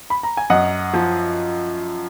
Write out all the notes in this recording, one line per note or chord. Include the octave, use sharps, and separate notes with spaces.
B5
A#5
G#5
F#2 D#5 F#5
F3